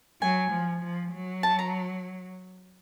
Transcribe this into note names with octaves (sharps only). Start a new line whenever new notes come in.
F#3 G#5
F3
F3
F#3
A5
A#5